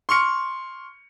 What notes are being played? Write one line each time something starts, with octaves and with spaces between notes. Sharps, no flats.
C6 C#6 F6 C#7